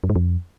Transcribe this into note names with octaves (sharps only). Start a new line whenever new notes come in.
F#2
G#2
F2